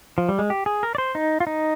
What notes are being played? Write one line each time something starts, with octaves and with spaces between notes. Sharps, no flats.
F3
G3
G#3
G4
G#4
A#4
D5
C5
D#4
F4
D#4